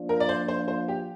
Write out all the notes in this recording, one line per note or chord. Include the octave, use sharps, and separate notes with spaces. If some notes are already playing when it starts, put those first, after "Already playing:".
Already playing: F3 A#3 D4 F4
A#4
D5
C5
C5
C5
G4